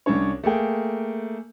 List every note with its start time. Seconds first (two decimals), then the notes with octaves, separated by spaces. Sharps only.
0.06 C2 C#4 D4 C#5
0.44 A3 A#3 G#4 G5